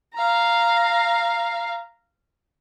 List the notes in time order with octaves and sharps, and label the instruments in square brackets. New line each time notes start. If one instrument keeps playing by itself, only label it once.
[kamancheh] F5 A#5